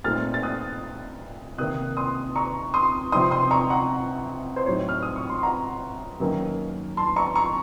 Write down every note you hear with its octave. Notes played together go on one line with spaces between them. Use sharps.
A#2 A3 C4 D#4 F6 A6
A6
D#6 F#6
C3 D#3 A#3 D#6 F#6
C6 D#6
A#5 C#6
C6 D#6
C3 F3 C4 D#4 C6 D#6
C6 D#6
A#5 C#6
F#5 A#5
C5
A2 F#3 C4 D#4 C#5
F6
D#6
C#6
C6
F#5 A#5
F#2 D#3 A#3 D#4
A5 C6
A#5 C#6
A#5 C#6